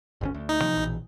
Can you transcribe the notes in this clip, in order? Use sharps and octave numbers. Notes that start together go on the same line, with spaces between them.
G1 D2 C#4
D2
D#4
C3 F3 A#3
A#1 B2 E3